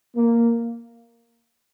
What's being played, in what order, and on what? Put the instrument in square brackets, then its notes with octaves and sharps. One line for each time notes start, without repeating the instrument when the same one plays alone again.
[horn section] A#3